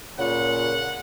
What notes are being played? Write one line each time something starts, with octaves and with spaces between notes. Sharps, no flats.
A#2 C#3 F#5